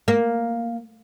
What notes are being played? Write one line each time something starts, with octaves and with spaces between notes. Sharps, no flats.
A#3